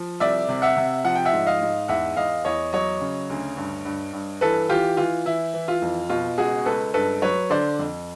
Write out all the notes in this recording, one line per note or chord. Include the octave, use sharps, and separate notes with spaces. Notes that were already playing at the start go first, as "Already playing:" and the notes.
Already playing: F3
C2 D5 E5
C3
E5 F#5
C3
F3 F#5
G5
E5 F#5
G#2
D#5 F5
G#2
E2 E5 F#5
E2 D#5 F5
E2 C#5 D#5
F#3 C#5 D#5
C#3
D2
G2
G2
G2
E3 A4 B4
E3 F4 G4
E3 F4
E3 E4
E3
F4
F2
B2 F4
C#2 F#4 G#4
C#2 A4 B4
G2 A4 B4
F#3 B4 C#5
D3 C5 D5
F2